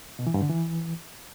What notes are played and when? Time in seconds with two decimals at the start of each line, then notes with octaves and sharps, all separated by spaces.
0.19 B2
0.27 E3
0.34 G2
0.42 D3
0.50 E3